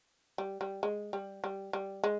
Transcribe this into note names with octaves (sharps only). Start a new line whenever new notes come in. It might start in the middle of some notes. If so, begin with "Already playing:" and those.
G3
G3
G#3
G3
G3
G3
G#3